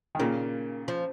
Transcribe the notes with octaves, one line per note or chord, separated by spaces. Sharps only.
D#3
A#2 C#3 A#3
F3